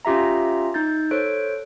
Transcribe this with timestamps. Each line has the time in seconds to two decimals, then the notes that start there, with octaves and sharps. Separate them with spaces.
0.05 C#4 F4 G4 E5 A#5
0.74 D#4 G6 A6
1.11 A4 C5 C#5 F#6 D7